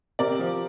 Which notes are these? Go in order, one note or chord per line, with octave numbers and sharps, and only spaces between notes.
C3 A#4 D5
F3